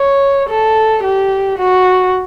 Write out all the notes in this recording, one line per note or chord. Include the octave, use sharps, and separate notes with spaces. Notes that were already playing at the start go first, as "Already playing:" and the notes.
Already playing: C#5
A4
G4
F#4